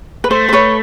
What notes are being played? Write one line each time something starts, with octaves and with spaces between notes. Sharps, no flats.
B4
A3 C5
C5
B4 C#5